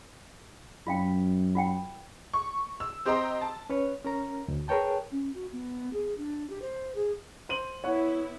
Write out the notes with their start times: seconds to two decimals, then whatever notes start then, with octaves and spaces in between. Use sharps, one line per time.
0.87 F#2 F4 F5 G5
1.55 F4 F#5 G5
2.33 C#6
2.80 E6
3.05 C4 G4 C5 D#5 A#5 C6
3.41 A5
3.70 C#4 B4 C#5
4.05 C#4 A#4 A#5
4.48 D2
4.68 G#4 A#4 B4 C#5 G5 A5
5.11 C#4
5.34 F#4
5.52 B3
5.93 G#4
6.18 D4
6.50 G4
6.62 C5
6.95 G#4
7.49 C5 D#7 F#7
7.84 B3 E4 C#5 F#5